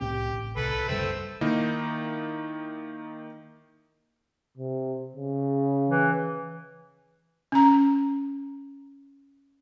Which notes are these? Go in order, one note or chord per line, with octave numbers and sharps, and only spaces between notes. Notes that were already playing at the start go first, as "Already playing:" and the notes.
C2 A2 C4 G4
A1
C2 A4 B4 B5
F#1 C2 G3 A3 C4 E6
D#3 A#3 D#4 E4
C3
C#3
E3
C#4 A#5